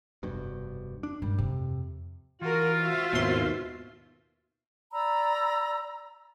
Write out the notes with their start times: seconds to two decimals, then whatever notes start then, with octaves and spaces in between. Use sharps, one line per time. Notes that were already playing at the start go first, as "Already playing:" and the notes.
0.23 F1 G2 B2
1.03 D4
1.22 G2 A#2 G3 G#3
1.38 F2 C3
2.42 E3 F4 F#4 A#4
2.81 F#4 C5 E5
3.12 D#2 G#2 B2 C4 E4 C6
4.93 D5 A#5 B5 E6